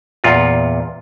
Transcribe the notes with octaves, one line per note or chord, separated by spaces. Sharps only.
E2 A#2 F4